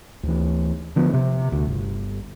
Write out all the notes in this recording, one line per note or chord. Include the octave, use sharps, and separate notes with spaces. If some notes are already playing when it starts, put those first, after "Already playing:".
D2 E3
D3 F3 B3
C3
D2
G1